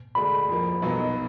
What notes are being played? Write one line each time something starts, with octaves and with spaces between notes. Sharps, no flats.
D2 D3 G#3 D4 B5
F2 F3 A#3
B1 B2 F#3 B3 D#4